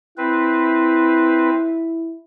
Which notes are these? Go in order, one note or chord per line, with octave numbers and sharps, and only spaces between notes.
C4 E4 B4